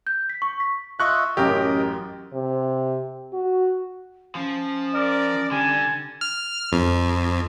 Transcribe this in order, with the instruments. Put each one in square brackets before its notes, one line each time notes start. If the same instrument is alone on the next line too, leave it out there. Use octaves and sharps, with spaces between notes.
[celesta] G6
B6
C#6
B6
[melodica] F4 D#5 E5 [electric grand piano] C#6 F#6
[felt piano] A1 F#2 [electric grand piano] G4 [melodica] A#4 D#5
[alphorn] C3
F#4
[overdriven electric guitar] F3 [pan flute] C#4
[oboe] A#4 [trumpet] D5
[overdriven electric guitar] D3 [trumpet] G3 [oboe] G#5
[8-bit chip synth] F6
F2